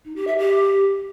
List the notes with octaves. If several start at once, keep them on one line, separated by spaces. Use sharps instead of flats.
D#4
G4
E5
G4